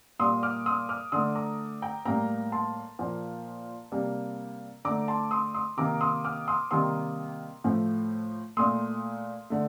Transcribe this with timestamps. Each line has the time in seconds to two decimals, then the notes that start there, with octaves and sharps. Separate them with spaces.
0.19 A#2 G3 A#3 C6 D#6
0.43 D6 F6
0.66 C6 D#6
0.89 D6 F6
1.12 D3 A3 C6 D#6
1.35 A#5 D6
1.82 G5 A#5
2.05 A2 G3 A#3 G5 A#5
2.52 A5 C6
2.99 A#2 F3 A#3
3.92 C3 G3 A#3
4.85 D3 A3 A#5 D6
5.08 A5 C6
5.31 C6 D#6
5.54 C6 D#6
5.77 C3 D#3 A#3 A#5 D6
6.01 C6 D#6
6.24 D6 F6
6.48 C6 D#6
6.71 C3 D#3 G3 A#3 C6 D#6
7.64 A2 F3 A3
8.57 A#2 A3 C6 D#6
9.50 D3 A3